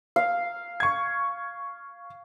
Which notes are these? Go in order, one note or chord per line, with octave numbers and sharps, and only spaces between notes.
F5
C#6 G#6